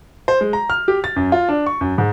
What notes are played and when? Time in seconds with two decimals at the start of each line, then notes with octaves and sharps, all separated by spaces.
0.28 C5
0.41 G#3
0.53 A#5
0.70 F6
0.88 G4
1.04 A6
1.16 F#2
1.32 F4
1.49 D4
1.66 C#6
1.81 F#2
1.98 G#2